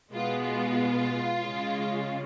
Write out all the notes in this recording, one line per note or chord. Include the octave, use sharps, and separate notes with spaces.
B2 G#3 B3 F4
F4
C#3 G#3 C#4